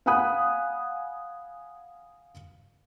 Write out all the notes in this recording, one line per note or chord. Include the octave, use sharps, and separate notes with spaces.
F5 F#5 G#5 B5 D#6 F#6